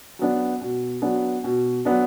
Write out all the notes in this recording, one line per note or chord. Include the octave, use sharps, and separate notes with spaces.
F#3 B3 D4
B2
F#3 B3 D4
B2
F#3 B3 D4